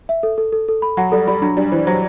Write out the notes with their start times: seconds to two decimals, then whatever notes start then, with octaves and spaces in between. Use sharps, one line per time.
0.09 E5
0.23 A4
0.38 A4
0.53 A4
0.68 A4
0.82 B5
0.97 F#3 F#5
1.12 G3 A4
1.27 G3 B5
1.42 F#3 D4
1.57 G3 D4
1.72 E3 C5
1.87 F#3 C5